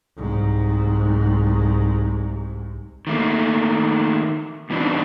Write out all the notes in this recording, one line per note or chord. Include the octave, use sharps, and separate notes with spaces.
C2 G#2
D#3 A3 A#3
G2 B2 E3 C4 D4 D#4